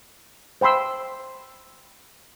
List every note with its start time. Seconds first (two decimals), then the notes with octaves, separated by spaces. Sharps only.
0.61 C5 G5 B5 C6 E6